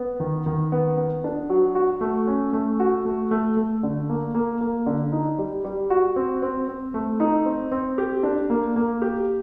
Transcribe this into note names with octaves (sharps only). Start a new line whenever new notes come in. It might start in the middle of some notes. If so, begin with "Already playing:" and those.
Already playing: B3
D#3
D#3
B3
B3
D4
F#3
F#4
A3
C#4
A3
F#4
A3
A3
A3
D3
A#3
A#3
A#3
D3
D#4
G3
G3
F#4
C4
C4
C4
A3
D#4
C4
C4
G4
D4
A#3
A#3
G4